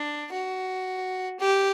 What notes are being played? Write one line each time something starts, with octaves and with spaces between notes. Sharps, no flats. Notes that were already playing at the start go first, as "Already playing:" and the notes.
Already playing: D4
F#4
G4